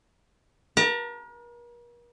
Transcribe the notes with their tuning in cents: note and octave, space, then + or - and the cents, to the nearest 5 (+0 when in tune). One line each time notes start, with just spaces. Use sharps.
A#4 +45 A#5 -40